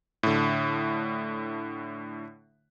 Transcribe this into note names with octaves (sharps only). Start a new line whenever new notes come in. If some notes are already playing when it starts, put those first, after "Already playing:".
A2 D3